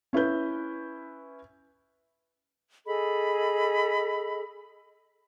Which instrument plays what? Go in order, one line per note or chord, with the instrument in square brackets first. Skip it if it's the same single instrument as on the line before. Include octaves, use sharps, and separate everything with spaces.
[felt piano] C#4 E4 B4 G6
[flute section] G#4 A4 D#5 B5